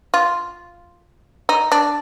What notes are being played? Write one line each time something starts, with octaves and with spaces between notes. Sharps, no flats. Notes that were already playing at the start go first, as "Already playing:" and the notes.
F4
D#4
D4